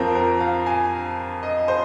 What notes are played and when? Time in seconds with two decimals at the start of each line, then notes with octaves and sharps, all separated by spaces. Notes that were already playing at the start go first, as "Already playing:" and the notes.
Already playing: F2 F3 C4 A#4
0.15 A#4
0.40 F5
0.66 G#5
1.43 D#5
1.68 C5